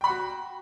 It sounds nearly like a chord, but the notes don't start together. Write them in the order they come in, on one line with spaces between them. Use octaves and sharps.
G5 B5 F#5 F#4